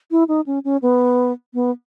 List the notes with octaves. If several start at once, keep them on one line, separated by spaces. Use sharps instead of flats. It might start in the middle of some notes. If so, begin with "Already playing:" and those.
E4
D#4
C#4
C#4
B3
B3